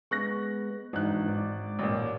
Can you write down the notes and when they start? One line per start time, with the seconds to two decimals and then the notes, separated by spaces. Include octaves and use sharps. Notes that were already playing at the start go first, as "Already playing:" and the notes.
0.11 G#3 B3 C#6 F#6 A#6
0.93 G#1 E3 D4 D#4 F#6
1.28 G#2 D5
1.79 A1 A#2